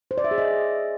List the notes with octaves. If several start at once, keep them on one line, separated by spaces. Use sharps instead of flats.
C5
D5
E5
G#4
D#5